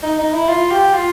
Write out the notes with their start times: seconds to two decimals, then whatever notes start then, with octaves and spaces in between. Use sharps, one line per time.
0.03 D#4
0.18 D#4
0.34 E4
0.48 F4
0.71 G4
0.94 F4